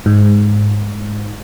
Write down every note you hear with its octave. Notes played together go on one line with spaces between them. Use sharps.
G#2